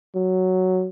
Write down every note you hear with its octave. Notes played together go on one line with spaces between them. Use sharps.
F#3